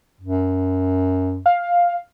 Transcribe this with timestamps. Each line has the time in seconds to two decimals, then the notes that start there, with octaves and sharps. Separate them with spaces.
0.21 F#2
1.46 F5